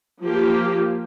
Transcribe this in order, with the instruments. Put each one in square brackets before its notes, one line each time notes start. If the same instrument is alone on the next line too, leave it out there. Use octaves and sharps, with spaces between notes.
[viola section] F3 A#3 G4